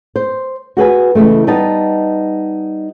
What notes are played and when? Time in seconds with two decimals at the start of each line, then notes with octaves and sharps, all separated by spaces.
0.16 C5
0.77 F#4 G#4 B4 G#5
1.15 C#3 E3 F#3 G#3 A3
1.47 G3 B3 D#4 A5